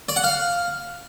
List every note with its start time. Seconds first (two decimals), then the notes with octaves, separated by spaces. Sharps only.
0.09 D5
0.16 F#5
0.24 F5